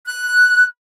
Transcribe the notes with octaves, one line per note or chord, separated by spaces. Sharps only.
F#6